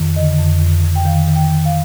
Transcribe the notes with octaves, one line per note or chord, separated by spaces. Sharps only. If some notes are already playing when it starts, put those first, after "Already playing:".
Already playing: F2 D#3
D3 D#5
F2
F2
F2
G5
D#3 F5
D#3
G5
D#3
F5